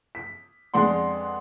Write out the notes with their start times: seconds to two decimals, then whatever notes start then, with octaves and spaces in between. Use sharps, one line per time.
0.15 B6
0.74 F2 G#3 B3 D4 F#5 C6